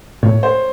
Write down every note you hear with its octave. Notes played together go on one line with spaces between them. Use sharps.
A2 C#5
C5